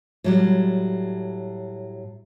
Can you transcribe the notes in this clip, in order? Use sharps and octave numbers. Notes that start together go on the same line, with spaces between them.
A2 F#3 G3